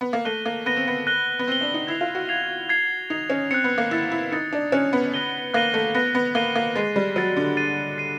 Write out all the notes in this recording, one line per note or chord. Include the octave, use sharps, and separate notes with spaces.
B3
A#3
A3 F#6 A#6 D#7 G7
A#3
B3 F#6 A#6 D#7 G7
C4
B3
F#6 A#6 D#7 G7
B3
C4 F#6 A#6 D#7 G7
D4
D#4
E4 G#6 C7 F7
F4
F#4
G#6 C7 F7
G#6 C7 F7
D#4 G#6 C7 F7
C#4
C4 F#6 A6 C#7
B3
A#3
E4 F#6 A6 C#7
E4
D#4 F#6 A6 C#7
D4
C#4 F#6 A6 C#7
B3
F#6 A#6 D#7 G7
A#3 F#6 A#6 D#7 G7
A3
B3 F#6 A#6 D#7 G7
B3
A#3 F#6 A#6 D#7 G7
A#3
G#3 A6 C7 D#7
G3
F#3 A6 C7 D#7
D3
A6 C7 D#7
A6 C7 D#7